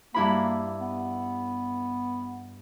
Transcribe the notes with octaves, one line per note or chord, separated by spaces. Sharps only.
G2 A#3 E4 B5
B3